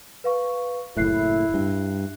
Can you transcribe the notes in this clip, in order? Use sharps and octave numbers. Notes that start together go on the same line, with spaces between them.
B4 F5 C#6
F#1 A2 E4 E5 F#6 C7
G2